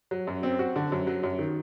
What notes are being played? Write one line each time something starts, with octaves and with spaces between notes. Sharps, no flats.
F#3
F#2
C4
F#4
D3
F#2
F#3
F#2
D#3